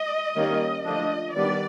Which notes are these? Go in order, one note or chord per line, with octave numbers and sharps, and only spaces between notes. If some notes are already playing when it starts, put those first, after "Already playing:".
Already playing: D#5
D#3 G3 A#3 C#4
D3 F3 A3 D4 D#5
D#3 G3 B3 D4 D5